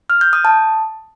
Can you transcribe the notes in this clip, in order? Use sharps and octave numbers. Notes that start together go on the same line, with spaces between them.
F6
G6
D#6
A5